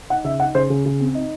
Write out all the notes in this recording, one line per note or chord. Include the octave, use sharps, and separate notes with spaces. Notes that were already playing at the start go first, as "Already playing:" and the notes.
D#4 F#5
C#3 E5
D#4 F#5
C#3 C5
C#3
C#3
C4
D#4